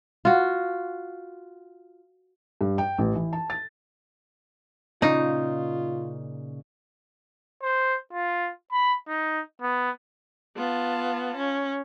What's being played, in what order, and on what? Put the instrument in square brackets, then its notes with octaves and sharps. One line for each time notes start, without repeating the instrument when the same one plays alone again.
[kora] F4 F#4
[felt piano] G2
G5
A1
E3
A5
A6
[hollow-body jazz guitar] A#2 C#3 [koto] D#4 [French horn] F4
[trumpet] C5
F4
B5
D#4
B3
[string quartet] B3 F4 A5
C#4